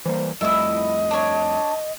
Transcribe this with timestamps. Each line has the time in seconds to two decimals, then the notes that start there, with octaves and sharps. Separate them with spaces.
0.05 E3 G3 A#3 C5
0.41 F2 G3 A3 E4 D#5 E6
1.11 D4 C#5